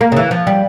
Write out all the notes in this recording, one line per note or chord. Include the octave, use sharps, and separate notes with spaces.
A#3
C#3
E3
F3
G3